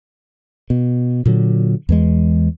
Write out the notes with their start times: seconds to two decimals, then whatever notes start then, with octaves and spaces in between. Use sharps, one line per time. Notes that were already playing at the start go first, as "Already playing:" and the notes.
0.70 B2
1.26 A#2 D3 F#3
1.89 E2 E3 G#3